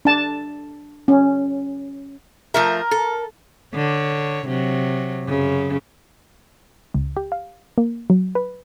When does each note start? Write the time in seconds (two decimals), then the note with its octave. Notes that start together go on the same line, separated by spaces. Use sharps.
0.05 D4 A5
1.08 C#4
2.54 F3 A3 A#4 E5
2.91 A4
3.74 D3 C#5
4.47 C3 F#3
5.27 F#2 C#3
6.94 C#2
7.17 G4
7.32 F5
7.78 A#3
8.10 F#3
8.35 B4